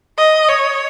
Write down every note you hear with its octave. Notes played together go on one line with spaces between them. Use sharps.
D#5
C#5